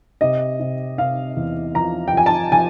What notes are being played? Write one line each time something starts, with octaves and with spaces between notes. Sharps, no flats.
C3 D#5
C3
C3 F5
E2
F3 A#5
G5
F3 G#5
A5
F3 G#5